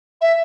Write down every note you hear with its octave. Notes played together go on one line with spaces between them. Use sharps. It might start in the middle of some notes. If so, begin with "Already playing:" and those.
E5